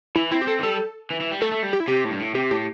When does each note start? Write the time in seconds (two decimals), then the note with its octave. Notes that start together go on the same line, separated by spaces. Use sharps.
0.16 E3 E4
0.31 C4 E4
0.41 G4
0.47 C4 A4
0.59 E3
0.63 G3 A4
1.10 E3
1.21 E3
1.31 G3
1.41 A3 A4
1.51 A3
1.63 G3
1.73 G4
1.80 E4
1.88 C3 G4
2.04 A2
2.11 G2
2.20 A2
2.35 C3 G4
2.51 A2 G4